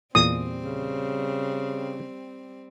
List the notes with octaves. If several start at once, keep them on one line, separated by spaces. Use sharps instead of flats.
E2 A#2 G3 C4 G#5 D#6
C#3